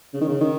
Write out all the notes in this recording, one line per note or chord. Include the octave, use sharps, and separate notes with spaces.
C#3
D#3
C#3
D#3